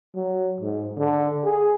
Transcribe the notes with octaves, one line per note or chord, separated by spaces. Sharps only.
F#3
G#2
D3
G#4